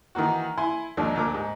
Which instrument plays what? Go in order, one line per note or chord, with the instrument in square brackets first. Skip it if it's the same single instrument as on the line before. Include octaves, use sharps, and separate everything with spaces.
[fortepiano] D#3 E3 A#3 F#4
E4 G#5 C6
G#1 D#2 D#3 F3 D4
D2 A#2 A#4 D6
G#2